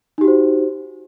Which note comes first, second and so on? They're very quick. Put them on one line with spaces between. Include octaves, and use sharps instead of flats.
D#4 G4 F#4 C5